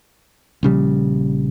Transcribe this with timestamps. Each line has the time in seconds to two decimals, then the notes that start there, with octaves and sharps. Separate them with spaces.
0.63 A#1 C#3 G3